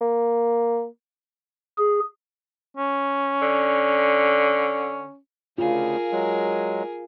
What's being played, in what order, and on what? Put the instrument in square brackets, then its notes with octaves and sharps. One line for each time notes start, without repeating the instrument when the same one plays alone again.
[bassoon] A#3
[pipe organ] G#4
[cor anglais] C#4
[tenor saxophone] D3
[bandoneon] D2 C#3 [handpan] F4 [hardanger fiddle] G#4 A#4
[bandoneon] F#3 G#3